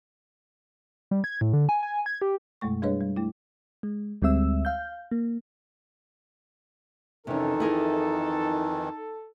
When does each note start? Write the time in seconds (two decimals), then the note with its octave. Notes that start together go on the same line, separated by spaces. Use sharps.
1.11 G3
1.24 G#6
1.41 A2
1.53 D3
1.69 G#5
1.83 G#5
2.06 G#6
2.22 G4
2.61 F#2 B2 G#3 A3 C#6
2.82 G3 D4 G#4 B4 C#5 D#5
3.01 G3
3.16 A3 E4
3.83 G#3
4.22 D2 G3 G#3 C4 E5 E6
4.65 F5 G6
5.11 A#3
7.27 F2 C3 D#3 E3 C#4 D#4 A4
7.60 E4 G#4 A#4